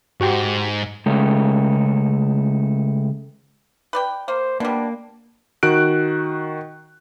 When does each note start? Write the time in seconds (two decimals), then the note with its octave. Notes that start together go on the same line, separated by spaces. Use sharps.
0.21 G#2 F#4 G4
1.06 C#3 G#3 A3
3.93 B4 D5 G5
4.28 A#3 C5
4.60 B2 G3 A#3 D4
5.63 D#3 F#4 F#6 D7